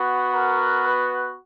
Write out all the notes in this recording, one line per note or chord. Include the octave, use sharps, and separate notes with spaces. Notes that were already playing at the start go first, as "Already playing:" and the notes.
Already playing: B3 F#4
A#4
B4